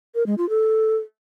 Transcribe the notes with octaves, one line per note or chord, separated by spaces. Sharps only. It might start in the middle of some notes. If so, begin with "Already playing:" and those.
A#4
G#3
F4
A4